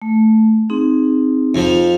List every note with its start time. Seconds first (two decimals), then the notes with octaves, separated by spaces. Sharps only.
0.02 A3
0.70 C4 D#4 G#4
1.55 F2 F3